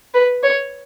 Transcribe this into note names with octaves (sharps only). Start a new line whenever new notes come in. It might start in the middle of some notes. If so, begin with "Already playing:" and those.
B4
C#5